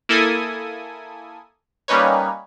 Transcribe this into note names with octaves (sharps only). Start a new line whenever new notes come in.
A#3 E4 A4 G#5 D#6
G3 A#3 C#4 D#4 B4 C#5